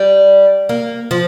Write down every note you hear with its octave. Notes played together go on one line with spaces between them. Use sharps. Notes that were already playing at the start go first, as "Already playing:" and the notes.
Already playing: G3
A#3
F3